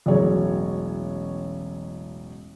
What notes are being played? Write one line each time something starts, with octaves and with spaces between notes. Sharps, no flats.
E1 A1 F#3 C#5